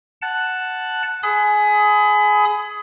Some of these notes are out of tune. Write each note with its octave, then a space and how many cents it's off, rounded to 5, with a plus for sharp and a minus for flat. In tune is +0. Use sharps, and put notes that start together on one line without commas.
F#5 +0 A5 +0
G#4 +15 B5 +35 D#6 +20